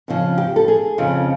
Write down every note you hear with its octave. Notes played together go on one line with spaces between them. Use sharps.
F2 C#3 F3
G4
A4
G#4
F2 C#3 F3